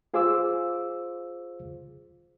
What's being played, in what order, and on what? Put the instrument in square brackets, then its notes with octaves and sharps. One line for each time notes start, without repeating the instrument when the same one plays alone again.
[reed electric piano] F4 G#4 C5 F5 D6 E6